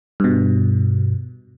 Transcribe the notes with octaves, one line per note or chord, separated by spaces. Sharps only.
G2 B2